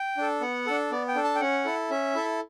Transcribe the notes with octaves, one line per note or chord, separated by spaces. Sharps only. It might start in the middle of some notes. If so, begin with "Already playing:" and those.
Already playing: G5
D4 A4
B3 F#5
D4 A4
B3 D5
G5
D4 A4
A5
G5
C#4 F#5
E4 A4
C#4 E5
E4 A4